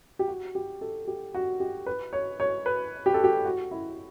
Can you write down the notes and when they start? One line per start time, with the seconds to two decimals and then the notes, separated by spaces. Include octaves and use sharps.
0.19 G4
0.28 F#4
0.55 G4
0.81 A4
1.07 G4
1.35 F#4
1.60 G4
1.86 B4
2.13 C#5
2.40 C#5
2.66 B4
3.06 G4
3.14 A4
3.24 G4
3.45 F#4
3.71 E4